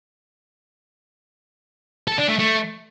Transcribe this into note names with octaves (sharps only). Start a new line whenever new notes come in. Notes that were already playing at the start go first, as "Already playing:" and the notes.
A4
D4
A3
A3